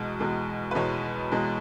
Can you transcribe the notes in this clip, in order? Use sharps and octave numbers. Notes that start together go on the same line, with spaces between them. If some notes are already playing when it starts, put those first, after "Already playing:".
Already playing: E2 B2 G#3
E2 B2 G#3
B4
E2 B2 G#3 C#5
E2 B2 G#3